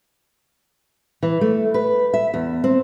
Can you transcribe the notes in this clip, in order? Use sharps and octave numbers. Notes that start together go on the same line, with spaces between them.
E3
A3
B4
E5
E2
C4